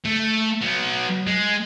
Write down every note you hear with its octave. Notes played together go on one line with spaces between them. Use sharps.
A3
F#3 B3
G#3